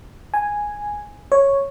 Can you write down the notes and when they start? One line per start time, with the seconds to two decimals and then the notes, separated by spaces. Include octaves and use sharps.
0.34 G#5
1.32 C#5